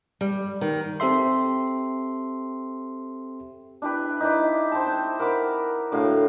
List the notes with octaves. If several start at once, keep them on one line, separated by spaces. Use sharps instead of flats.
G3
D#3
C4 G4 A4 E5 C6
D4 E4 G4 B4
D#4 E4 B4 D5
C5 G5 A5
C4
A#4 F#5 B5 D6
A2 D3 F#3 F5